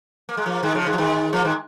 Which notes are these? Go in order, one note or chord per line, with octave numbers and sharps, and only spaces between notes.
A#3
G#3
F3 A#3
D#3 G#3
C#3 F3
D#3 G#3
F3
D#3 G#3
F3 A#3
D#3 G#3